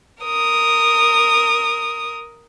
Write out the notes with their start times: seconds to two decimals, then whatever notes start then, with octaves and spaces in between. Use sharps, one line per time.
0.24 A#4 D#6